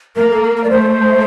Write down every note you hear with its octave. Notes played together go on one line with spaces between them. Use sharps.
A#3 A#4
A4
A#4
A#4
D5
A3 C5